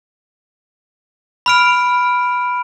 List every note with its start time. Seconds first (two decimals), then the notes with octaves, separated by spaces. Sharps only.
1.46 B5 F6 D7